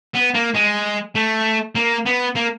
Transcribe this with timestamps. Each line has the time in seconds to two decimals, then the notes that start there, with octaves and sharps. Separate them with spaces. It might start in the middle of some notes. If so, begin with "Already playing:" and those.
0.14 B3
0.34 A#3
0.54 G#3
1.15 A3
1.75 A#3
2.06 B3
2.36 A#3